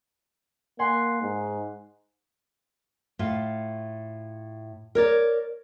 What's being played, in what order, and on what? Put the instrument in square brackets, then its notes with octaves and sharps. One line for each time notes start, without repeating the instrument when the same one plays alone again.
[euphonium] A#3 [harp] F#5 G#5 C6
[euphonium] G#2
[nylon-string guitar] A2 F4
A#4 C#5 D5